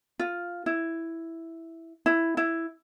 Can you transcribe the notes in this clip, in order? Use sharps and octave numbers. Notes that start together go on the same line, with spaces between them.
F4
E4
E4
E4